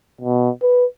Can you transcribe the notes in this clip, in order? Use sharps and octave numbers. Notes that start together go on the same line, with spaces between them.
B2
B4